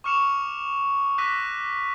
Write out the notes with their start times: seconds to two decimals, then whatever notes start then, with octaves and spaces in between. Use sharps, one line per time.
0.04 C#6 D6 F6 C#7 E7 F7
1.18 D6 E6 F#6 A#6 B6 D#7